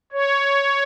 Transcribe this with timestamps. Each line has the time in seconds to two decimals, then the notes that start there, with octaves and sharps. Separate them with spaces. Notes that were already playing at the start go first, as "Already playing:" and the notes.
0.13 C#5